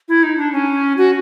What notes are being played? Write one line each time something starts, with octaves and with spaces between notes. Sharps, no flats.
E4
D#4
D4
C#4
F#4